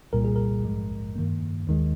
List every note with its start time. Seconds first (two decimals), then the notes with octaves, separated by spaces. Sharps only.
0.13 C2 A#2 G3 A#4
0.24 G#4
0.36 A#4
0.64 A#1 G#2 F3 G#3
1.16 G2 D#3 A#3
1.67 D#2 D#3 G#3